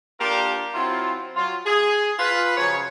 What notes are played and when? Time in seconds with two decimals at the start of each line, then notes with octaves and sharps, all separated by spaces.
0.20 A#3 D4 F4 G4 A4 A#4
0.74 F#3 C4 E4 F4
1.36 F#3 F4
1.66 G#4
2.19 F4 B4
2.57 F#2 C#3 F3 C#5